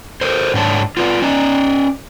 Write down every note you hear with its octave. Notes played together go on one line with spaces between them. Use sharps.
A4 A#4 C5
G#2 D4 C#5 A5
F4 B4 D5
C#4 D5 D#5